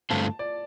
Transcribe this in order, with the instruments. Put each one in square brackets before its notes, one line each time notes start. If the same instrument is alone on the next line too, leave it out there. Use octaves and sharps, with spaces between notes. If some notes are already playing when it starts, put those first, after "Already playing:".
[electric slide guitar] G2 D3 A3 C4 F4 [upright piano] A5
[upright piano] D5